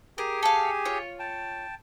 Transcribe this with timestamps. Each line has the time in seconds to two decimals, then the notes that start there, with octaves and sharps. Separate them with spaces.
0.18 G4 G#4 A#4 G#5
0.43 A4 F5
0.85 F4 C#5
1.19 G5 A5